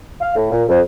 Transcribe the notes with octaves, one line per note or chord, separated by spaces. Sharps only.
F5
A2
A#2
F2